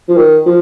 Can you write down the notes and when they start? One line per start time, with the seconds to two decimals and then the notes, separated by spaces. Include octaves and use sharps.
0.08 F3
0.17 D#3
0.46 F3